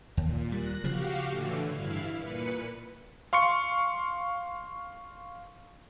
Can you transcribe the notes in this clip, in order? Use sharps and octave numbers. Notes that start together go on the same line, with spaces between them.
D#2 A#2
G3 F#6 A#6
C#3 F3 F#4 G4 F5
A2 D3 E3
G2 E4 F5
A#2 B4 C#7
F5 C6 C#6 C#7